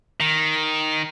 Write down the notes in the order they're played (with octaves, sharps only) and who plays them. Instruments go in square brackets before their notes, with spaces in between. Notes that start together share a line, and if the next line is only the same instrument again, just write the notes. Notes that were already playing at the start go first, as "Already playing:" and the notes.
[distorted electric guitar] D#3